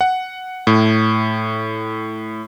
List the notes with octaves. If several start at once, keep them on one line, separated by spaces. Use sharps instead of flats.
F#5
A2